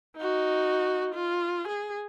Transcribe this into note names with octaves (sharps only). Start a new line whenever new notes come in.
D#4 F#4
F4
G#4